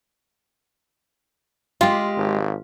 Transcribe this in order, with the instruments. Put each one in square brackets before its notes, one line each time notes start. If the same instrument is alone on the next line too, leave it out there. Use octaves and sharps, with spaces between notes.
[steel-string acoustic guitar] G#3 G4 [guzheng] F4 [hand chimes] F5
[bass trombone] G#1